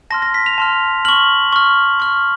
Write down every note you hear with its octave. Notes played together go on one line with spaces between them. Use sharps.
A5 C6 F6 A#6
A#6
B6
F7
A5 C6 F6
C#6 F6 F#7
C#6 F6
C#6 F6